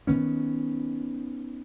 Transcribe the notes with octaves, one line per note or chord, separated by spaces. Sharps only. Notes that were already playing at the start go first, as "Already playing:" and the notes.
D#3 B3 C#4